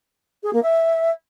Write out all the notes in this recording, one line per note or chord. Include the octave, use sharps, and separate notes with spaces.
G#4
A#3
E5